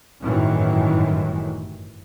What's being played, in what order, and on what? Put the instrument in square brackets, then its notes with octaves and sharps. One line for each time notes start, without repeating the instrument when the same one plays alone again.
[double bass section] G1 F#2 A2 D#3 E3 F#3